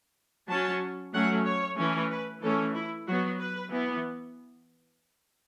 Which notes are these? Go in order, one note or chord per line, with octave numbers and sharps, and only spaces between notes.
F#3 C#4 A5
F#3 A3 C#4 F#5
C#5
E3 A3 C#4
B4
E3 A3 C#4 A4
E4
F#3 B3 F#4
B4
E3 B3